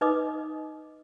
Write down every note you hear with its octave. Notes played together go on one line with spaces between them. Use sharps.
D#4 B4 D#5 D6 D#6